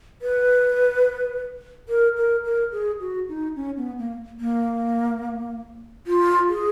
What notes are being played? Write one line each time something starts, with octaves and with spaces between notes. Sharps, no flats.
B4
A#4
A#4
A#4
G#4
F#4
D#4
C#4
B3
A#3
A#3
F4
G#4